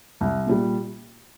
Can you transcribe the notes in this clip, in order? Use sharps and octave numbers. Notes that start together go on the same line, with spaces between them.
C2
A#2 G3